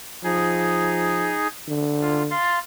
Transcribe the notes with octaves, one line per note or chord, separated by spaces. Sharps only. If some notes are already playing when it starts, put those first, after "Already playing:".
F3 D#4 G#4
D3
F4
F5 C6 A6